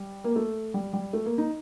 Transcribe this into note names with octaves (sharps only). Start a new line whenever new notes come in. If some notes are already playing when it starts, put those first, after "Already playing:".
Already playing: G3
A#3
A3
G3
G3
A3
A#3
D#4